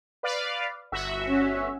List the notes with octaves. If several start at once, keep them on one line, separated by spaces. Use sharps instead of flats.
B4 D5 F5
G1 F#4 E5
C#4